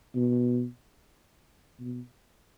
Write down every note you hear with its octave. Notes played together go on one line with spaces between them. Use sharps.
B2
B2